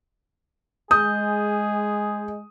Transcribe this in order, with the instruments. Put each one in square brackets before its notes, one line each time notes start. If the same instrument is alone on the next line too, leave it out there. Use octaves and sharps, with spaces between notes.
[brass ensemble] G#3 [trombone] G#4 [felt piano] D#6 [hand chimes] G6